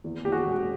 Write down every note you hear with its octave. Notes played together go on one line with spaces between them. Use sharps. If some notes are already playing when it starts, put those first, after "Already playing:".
E2
E2 G4
F#4 G#4
E1